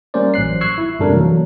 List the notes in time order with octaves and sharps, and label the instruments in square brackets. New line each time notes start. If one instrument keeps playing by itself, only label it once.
[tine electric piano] G3 A#3 C#4 A#4 C5 D5
A1 F#3 F#6 C7
C#6 E6 F#6 G#6 C7
E4
F#2 C3 G3 D4 A4 A#4
E3 F#3 A#3